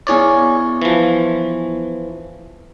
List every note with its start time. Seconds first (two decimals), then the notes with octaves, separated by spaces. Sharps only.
0.07 B3 E4 G#4 C#5 D5 C#6
0.82 E3 F3